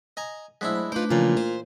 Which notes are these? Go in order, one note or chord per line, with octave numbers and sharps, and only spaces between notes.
D#5 G#5 A#5
F#3 G#3 A3 D4 E4 C5
B5
A3 D4 D#4 F4 B4 C5
A#2 C#3 E3 F3
F4 C5